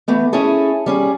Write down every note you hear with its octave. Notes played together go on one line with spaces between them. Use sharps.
E3 A3 B3
C#4 E4 G#4 A4
G3 C#4 G#4